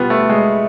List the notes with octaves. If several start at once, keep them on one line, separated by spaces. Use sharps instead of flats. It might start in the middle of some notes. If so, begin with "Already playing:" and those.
Already playing: B2 G3 B3 F4
A3
G#3